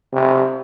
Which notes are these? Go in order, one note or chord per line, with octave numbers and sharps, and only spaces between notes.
C3